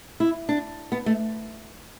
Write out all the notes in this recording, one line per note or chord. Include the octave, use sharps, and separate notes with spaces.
E4
D4
B3
A3